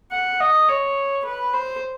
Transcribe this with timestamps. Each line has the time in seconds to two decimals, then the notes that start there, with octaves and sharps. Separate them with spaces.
0.12 F#5
0.40 D#5
0.69 C#5
1.25 B4
1.54 C5